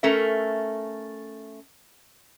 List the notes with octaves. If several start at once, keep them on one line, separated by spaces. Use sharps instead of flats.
A3 C#4 A#4 E5